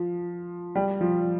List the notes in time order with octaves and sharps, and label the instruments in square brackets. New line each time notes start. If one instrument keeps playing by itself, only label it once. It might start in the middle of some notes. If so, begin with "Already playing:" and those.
Already playing: [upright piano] F3
G3
F3